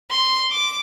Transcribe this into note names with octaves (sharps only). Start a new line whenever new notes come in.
C6
D6